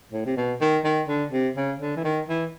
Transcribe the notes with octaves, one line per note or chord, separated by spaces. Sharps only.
A2
C3
B2
D#3
D#3
D3
C3
C#3
D3
E3
D#3
E3